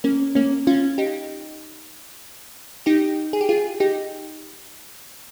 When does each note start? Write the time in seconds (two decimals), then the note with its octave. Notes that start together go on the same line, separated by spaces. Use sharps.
0.04 A#3 C#4
0.35 A#3 C#4
0.67 C#4 F4
0.98 D#4 G4
2.86 D#4 G4
3.33 G#4
3.41 G4
3.49 F4 G#4
3.80 D#4 G4